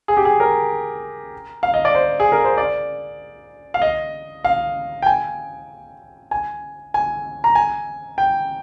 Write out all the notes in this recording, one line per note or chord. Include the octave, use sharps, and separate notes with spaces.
G#4
G4
G#4
A#4
F5
D#5
D5
C5
G#4
A#4
C5
D5
F5
D#5
F5
G5
G#5
G#5
G#5
A#5
G#5
G5